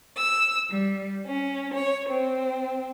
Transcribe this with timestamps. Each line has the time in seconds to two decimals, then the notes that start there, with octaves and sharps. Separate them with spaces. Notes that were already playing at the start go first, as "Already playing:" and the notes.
0.17 E6
0.71 G3
1.26 C#4
1.73 C#5
2.10 C4